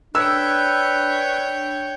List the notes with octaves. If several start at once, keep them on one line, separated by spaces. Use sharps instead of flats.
D4 B4 C#5 G5 E6